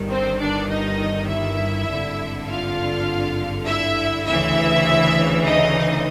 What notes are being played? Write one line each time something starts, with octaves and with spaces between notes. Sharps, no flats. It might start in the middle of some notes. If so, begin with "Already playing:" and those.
Already playing: G1 G2 D#3
C4 C5
D4 D5
D#4 D#5
E4 E5
G#1 G2 D3
F4 F5
E4 E5
D2 C#3 E3 E4 E5
D#4 D#5